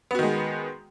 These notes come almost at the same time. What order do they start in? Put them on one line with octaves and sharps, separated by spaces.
B3 F#4 D#3 G#3